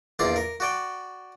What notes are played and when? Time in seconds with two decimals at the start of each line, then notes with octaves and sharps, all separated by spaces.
0.19 A#1 E2 A#3 F4 D5 D6
0.36 A#4
0.60 F#4 D5 G5